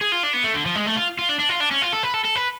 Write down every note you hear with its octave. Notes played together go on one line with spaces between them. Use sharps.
G#4
F4
D4
B3
A3
D3
F3
G#3
A3
F4
F4
D4
D4
F4
D4
C#4
F4
A4
B4
A4
A4
B4